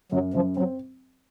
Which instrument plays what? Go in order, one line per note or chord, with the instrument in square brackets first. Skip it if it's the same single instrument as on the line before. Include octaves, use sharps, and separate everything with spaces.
[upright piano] F#2 [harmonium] F#3
[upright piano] F#2 [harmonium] F3
[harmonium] F#3 [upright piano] C4